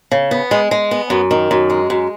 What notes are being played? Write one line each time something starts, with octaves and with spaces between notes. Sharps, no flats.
C#3
B3
G#3
G#3
B3
F#2
D#3
F#2
G#3
F#2